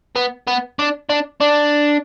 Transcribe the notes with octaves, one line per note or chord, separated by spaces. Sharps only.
B3
B3
D4
D4
D4